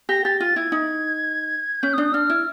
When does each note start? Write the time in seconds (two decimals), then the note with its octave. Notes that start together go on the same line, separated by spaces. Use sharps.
0.09 G4 A#6
0.25 G4 A6
0.40 F4 A6
0.56 E4 G#6
0.72 D#4
1.82 C#4 G6
1.93 D#6
1.98 D4
2.04 D#6
2.14 D4 F6
2.30 E4